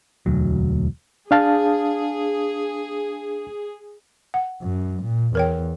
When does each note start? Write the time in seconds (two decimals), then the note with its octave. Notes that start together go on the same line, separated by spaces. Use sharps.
0.26 E1 D2 F#3
1.31 D4 G#4 F5 A5
4.34 F#5
4.63 F#2
5.04 A#2
5.35 E2 A#4 C#5 G5